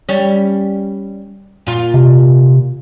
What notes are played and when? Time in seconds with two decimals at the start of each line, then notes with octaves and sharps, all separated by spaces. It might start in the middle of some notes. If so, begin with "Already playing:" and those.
0.09 G3 C#4
1.67 A#2 F4
1.94 C3